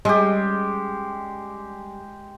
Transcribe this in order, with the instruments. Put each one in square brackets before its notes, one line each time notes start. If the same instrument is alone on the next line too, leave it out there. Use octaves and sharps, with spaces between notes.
[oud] G3 C#4 G#4 [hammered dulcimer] G#3 G4